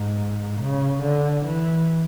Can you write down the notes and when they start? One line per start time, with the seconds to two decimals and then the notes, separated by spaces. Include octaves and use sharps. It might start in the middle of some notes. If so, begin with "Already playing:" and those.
Already playing: G#2
0.61 C#3
1.03 D3
1.46 E3